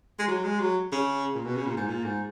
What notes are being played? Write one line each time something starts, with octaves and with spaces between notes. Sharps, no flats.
G#3
F#3
G#3
F#3
C#3
A#2
B2
C#3
A#2
G#2
A#2
G#2